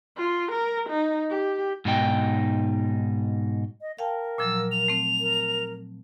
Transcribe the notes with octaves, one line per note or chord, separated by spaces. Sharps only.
F4
A#4
D#4
G4
G#2 B2 D#4 G5
D#5
A#4 F5 G5 A5
A#2 F3 F#3 E6
F7
A3 C4
A#4